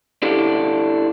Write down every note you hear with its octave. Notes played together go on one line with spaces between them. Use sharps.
D4 E4 G4 A4